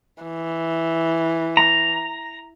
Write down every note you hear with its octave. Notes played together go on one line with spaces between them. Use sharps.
E3
A#5